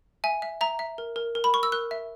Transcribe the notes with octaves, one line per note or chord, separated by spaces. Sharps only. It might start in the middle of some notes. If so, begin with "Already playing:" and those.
E5 G#5
E5
E5 A#5
E5
A#4
A#4
A#4
B5
A#4 C#6
E6
A#4 F#6
E5